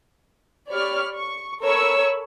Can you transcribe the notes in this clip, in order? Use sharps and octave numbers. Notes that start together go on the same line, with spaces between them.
G4 C#5 D5 B5 C#6 F6
C#6
A4 A#4 C#5 B5 C#6 E6